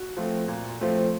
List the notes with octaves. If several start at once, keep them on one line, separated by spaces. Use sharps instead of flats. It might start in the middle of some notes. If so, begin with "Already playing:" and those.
Already playing: F#4
F3 A3 C4
A#2
F3 A3 C4